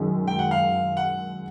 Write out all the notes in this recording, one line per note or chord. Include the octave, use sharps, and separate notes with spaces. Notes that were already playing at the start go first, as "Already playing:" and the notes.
Already playing: F#2 D#3 G#3
G5
F#5
F5
F#5